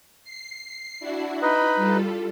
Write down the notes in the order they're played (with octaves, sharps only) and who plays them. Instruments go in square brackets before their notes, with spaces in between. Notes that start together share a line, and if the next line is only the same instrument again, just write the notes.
[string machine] C7
D4 E4 F#4
[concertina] D#4 B4 D#5 [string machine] B5
[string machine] G3 F4 A4